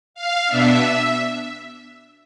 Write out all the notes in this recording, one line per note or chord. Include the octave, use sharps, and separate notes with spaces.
F5
B2 B3 D4 E5